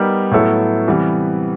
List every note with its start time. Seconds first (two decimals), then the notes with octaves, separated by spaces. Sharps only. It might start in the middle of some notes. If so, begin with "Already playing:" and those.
Already playing: G3 B3 D#4 G4 A#4
0.31 A2 F#3 B3 E4 A4
0.88 C3 E3 G3 B3